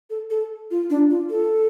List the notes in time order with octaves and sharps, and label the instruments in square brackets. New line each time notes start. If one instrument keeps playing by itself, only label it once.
[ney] A4
A4
F4
D4
F4
A4